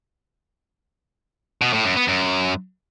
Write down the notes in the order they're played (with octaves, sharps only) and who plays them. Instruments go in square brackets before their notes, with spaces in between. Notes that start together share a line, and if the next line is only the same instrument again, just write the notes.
[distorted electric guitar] B2
A2
F#2
B3
F#2